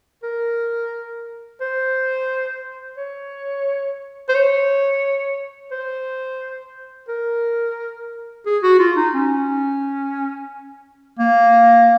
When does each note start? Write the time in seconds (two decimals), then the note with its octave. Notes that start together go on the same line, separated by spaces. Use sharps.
0.23 A#4
1.61 C5
2.97 C#5
4.29 C5
4.35 C#5
5.71 C5
7.08 A#4
8.46 G#4
8.63 F#4
8.79 F4
8.96 D#4
9.15 C#4
11.19 A#3